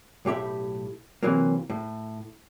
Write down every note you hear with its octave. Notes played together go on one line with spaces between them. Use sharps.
B1 A2 G4 E5 B5
C3 E3 F#3 A#3
A2